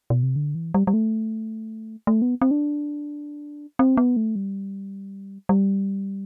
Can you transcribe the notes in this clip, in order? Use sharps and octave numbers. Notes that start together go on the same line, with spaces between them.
B2
C3
D3
E3
G3
G3
A3
A3
B3
C4
D4
C4
B3
A3
G3
G3